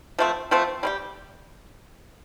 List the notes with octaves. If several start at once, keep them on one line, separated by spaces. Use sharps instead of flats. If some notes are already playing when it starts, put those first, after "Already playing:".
F3 A3 C4
F3 A3 C4
G3 C4 G4